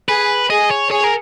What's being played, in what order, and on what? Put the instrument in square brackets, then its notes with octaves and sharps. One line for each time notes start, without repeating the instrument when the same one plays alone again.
[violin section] G#4 [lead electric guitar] B4
[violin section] G#4 [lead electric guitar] D#5
[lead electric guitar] C#5
[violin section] G#4 [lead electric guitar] C#5
[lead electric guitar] A#4